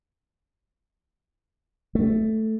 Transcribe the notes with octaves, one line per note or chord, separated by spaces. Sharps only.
A3